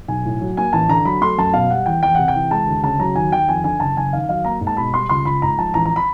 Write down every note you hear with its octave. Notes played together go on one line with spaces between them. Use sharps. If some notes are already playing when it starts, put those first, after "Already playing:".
B1 G#5
A2
F#3
A#3 G#5
A1 A5
D3 A#5
F#3 B5
A3 C6
F#2 A5
B2 F5
G3 F#5
E2 G5
E2 G5
C3 F#5
G5
E3
G#3 A5
D2
C#3 A5
F#3 A#5
D#2 G#5
D#2 G5
F2 G#5
D3 G#5
F#1 A5
F#1 G#5
D#3 F5
F#3 F5
A#3 A#5
G#2
A5
B2 B5
G3 C6
C#2 C6
C#2 B5
G#2 A#5
F3 A5
A1 A#5
A#5
B5